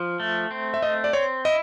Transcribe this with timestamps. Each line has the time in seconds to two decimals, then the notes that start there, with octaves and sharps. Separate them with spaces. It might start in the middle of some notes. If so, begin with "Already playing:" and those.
Already playing: F3
0.20 A3
0.51 C4
0.74 E5
0.82 A3 D#5
1.04 D5
1.13 C4 C#5
1.45 E4 D#5